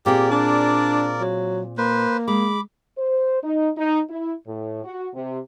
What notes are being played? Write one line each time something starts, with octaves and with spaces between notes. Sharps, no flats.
A#2 C4 G4 G#4 A#4 D5
D4
F#3
A#3 B4 C5
G#3 B5 D6
C5
D#4
D#4
E4
A2
F#4
C3